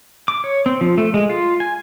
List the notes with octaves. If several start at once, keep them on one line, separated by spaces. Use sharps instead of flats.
D6
C#5
C4
F3
A3
G#3
F4
G#5